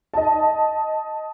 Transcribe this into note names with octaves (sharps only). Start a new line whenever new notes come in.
D#5 A5